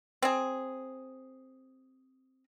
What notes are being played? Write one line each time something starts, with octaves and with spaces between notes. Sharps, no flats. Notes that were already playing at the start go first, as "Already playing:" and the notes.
C4 G#4